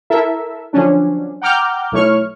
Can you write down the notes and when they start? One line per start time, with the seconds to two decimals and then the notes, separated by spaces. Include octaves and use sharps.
0.10 E4 A4 A#4 E5
0.73 D3 F3 F#3 C#4 D4
1.42 F#5 G5 A#5 D6 F6 G6
1.92 B1 A3 E4 C#5 C#6 F6